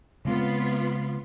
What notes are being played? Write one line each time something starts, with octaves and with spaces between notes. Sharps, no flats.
C#3 G#3 B3 C4 F4